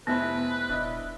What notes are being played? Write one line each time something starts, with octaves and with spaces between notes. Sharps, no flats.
F1 B3 E4 B4 C5
D#1 D4 E4 D#5